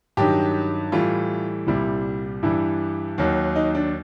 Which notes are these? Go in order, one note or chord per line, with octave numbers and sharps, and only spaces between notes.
G2 D#3 F#3 G4
A2 E3 G3 F4
C2 A#2 G3 E4
G2 E3 G3 E4
D#2 D#3 F#3
D#4
D4